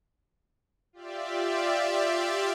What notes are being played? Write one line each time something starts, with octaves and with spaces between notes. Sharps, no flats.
F4 G4 D5 E5